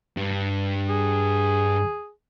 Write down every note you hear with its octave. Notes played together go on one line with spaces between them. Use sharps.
G2
G#4